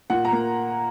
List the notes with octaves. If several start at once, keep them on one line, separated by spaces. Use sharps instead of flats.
A#2 F#5
A#5
A#3